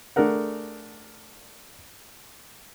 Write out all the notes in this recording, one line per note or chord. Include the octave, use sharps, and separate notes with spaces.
A3 D4 G#4 A#4 F#5